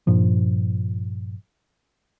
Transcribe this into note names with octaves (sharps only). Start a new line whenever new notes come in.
G2 A#2 F3